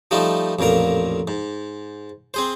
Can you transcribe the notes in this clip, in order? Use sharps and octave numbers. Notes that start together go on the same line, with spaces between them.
F3 G3 A3 D#4
A1 F2 A#2 A#4 A#5
G#2
C4 G#4 C5